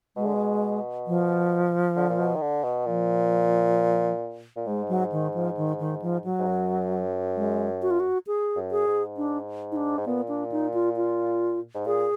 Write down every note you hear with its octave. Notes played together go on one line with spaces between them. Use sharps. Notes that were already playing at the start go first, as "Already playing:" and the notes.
B2 G#3
D3
B2
F3
D3
A#2
B2
D#3
D3
B2
A#2 F3
A#2
G#2 G#3
F#3
D#3
F3
D#3
D#3
F3
F#3
G#2
F#2
G#3
F#4
F4
F#4
G#4
F#2
G#4
G#2
D4
D#4
D4
G#2
A#2 B3
D4
D#4
F4
F4
G#2
A#2 G#4